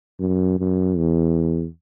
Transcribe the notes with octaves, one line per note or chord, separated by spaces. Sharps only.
F#2
F#2
E2